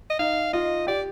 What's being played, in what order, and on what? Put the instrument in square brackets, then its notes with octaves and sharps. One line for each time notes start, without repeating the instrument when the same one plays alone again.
[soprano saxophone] D#5
[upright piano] D#4 [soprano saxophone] F5
[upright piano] F4 [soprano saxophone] D#5
[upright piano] G4 [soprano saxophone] D5